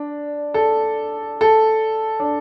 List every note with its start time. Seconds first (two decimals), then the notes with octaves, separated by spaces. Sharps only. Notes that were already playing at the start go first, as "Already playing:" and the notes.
Already playing: D4
0.54 A4
1.41 A4
2.20 D4